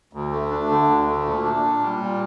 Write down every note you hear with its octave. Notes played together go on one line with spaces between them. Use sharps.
D2
A3
D4
D3
D2
A3
A#2
D4
A#2
G3
A#2